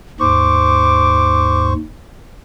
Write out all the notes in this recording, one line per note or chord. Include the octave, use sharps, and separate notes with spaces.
D#2 G#2 C5 C#6 D6